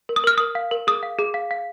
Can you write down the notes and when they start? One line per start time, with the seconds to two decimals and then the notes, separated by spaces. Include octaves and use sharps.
0.09 A#4
0.16 D#6
0.24 A#4 F6
0.38 A#4 D#6
0.55 F5
0.71 A#4
0.87 G#4 D#6
1.03 F5
1.19 G#4
1.34 F5
1.51 F5